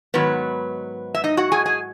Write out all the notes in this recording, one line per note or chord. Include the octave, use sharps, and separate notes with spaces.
G#2 D#3 F#3 B3 B4
E5
D#4 D#5
F#4 F#5
G#4 G#5
G#4 G#5